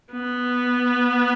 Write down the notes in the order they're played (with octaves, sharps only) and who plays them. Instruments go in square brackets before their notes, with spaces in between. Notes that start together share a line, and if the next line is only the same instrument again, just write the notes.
[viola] B3